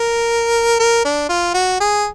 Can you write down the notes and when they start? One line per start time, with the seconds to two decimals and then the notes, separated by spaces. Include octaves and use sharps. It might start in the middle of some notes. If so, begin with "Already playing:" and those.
Already playing: A#4
0.79 A#4
1.05 D4
1.29 F4
1.54 F#4
1.80 G#4